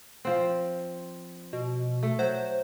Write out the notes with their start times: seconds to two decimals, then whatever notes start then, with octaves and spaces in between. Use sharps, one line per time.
0.25 F3 C4
1.53 B2
2.03 A3
2.19 F#3 C5